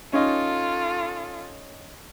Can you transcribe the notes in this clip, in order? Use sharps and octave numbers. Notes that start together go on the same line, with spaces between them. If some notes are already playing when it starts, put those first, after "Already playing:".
C#4 D#4 F4 A4